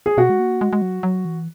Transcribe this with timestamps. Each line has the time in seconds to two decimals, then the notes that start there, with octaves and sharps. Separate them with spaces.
0.06 G#4
0.17 B2 F#4
0.30 G#3
0.39 A#3
0.61 G#3
0.73 G#3
0.82 F#3
1.03 F#3
1.25 E3